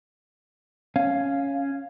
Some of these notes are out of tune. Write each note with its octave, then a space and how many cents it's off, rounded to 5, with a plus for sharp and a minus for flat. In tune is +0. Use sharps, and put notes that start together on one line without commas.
C#4 +0 F5 +0